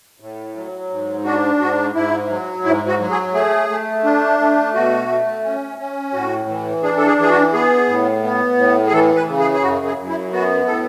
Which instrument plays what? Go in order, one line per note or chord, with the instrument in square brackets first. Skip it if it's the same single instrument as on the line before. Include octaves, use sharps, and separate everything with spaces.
[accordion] A2
F#3
G#2
D4 F#4
G#2 F#4
G#2 E4
F#3
G#2 E4
F#4
F#3
G#4
A3 G#4
A3
D4
A3
B2 F#4
A3
C#4
C#4
A2 F#4
E3
D4 G#4
A4
G#4
E3 G#4
F#4
B3 G#4
A2
B3
A2
G#4
E3 A4
B4
C#3
G#4
G#4
F#2 F#4
G#4
F#2
E4
B3 F#4
A2 A4